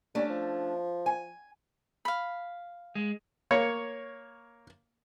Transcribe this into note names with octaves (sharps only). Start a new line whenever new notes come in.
G3 A3 C#4 D4
F3
G#5
F5 B5
G#3
A#3 C#5